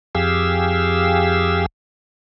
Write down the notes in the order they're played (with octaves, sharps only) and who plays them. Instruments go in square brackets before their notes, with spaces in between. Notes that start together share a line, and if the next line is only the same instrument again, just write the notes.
[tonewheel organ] F2 G4 G#4 F5 E6